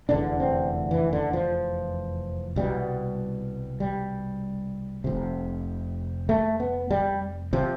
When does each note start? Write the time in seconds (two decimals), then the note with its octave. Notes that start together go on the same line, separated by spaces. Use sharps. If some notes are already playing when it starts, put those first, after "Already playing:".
0.09 F1 E2 D3 D4
0.40 C4
0.91 E3
1.13 D3
1.33 F3
2.56 C2 B2 G3
3.80 G3
5.04 F1 F2 C3
6.29 A3
6.60 B3
6.91 G3
7.53 C3 F3